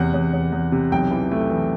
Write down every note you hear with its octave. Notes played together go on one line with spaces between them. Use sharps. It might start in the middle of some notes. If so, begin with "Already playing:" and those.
Already playing: E2 C3 F#5
E2
E2
E2
C3
B1 G5
E3
A3
E3